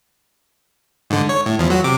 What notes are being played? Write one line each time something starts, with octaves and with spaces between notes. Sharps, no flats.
G#2 D3
C#5
A2
E2 F3
F#3 F#4
C3 D6